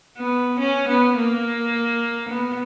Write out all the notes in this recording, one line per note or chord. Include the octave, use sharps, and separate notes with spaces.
B3
C#4
B3
A#3
B3